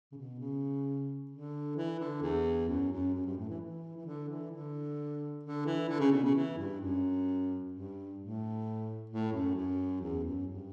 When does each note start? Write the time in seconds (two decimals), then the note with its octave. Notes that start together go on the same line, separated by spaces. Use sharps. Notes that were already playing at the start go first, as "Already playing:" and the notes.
0.12 C#3
0.17 B2
0.39 C#3
1.31 D3
1.77 E3
2.00 D3
2.22 E2
2.68 F#2
2.92 F#2
3.14 F#2
3.26 G2
3.37 A2
3.49 E3
3.61 E3
3.97 E3
4.06 D3
4.29 E3
4.52 D3
5.44 D3
5.66 E3
5.89 D3
6.00 C#3
6.12 B2
6.24 C#3
6.35 E3
6.58 G2
6.81 F#2
7.72 G2
8.19 A2
9.10 A2
9.33 F#2
9.56 F#2
10.01 E2
10.25 F#2
10.48 G2